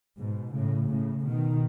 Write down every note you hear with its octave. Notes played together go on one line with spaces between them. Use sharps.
G#2 B2
A2 C#3
A2 C#3
B2 D#3